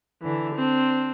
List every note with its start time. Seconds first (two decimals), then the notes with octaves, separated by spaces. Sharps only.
0.22 D3 E3
0.55 C4 D4